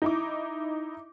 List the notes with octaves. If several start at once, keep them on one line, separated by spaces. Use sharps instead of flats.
D#4 E4 D6